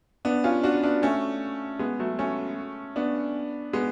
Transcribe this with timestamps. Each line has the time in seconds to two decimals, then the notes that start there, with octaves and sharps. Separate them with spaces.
0.25 B3 D4
0.44 C#4 F4
0.63 D4 F#4
0.83 B3 D4
1.03 A3 C#4
1.79 G#3 B3
1.99 F#3 A3
2.19 A3 C#4
2.96 B3 D4
3.73 G#3 B3